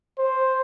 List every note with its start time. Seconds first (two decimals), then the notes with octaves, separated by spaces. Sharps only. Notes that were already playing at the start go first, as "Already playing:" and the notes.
0.18 C5